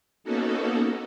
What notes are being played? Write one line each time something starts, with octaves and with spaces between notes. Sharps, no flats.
A#3 B3 C#4 D#4 F#4 A4